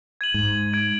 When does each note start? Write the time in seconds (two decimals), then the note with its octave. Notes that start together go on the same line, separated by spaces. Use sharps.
0.21 G#6 D#7 F#7
0.34 G#2
0.73 G#6 D7